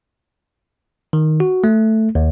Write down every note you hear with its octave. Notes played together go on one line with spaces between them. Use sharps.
D#3
F#4
A3
D#2